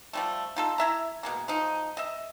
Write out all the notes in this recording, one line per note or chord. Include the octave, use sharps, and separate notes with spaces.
F3 G3 A3
D#4 F4 A4
E4 E5 A#5
B2 G#3 A#3
F3 D#4
D#5 E5